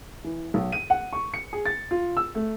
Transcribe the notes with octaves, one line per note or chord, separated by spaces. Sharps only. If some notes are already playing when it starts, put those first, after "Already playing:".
E3
B1
D#7
F#5
C#6
C#7
G#4
A6
F4
E6
A3